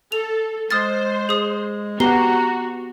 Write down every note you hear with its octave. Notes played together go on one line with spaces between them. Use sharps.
A4 F7
G#3 C5 D#6 F6 A6
G#4 D#6
B3 F#4 G4 A#5 C7 G7